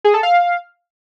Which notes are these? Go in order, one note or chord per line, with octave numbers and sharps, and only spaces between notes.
G#4
A4
F5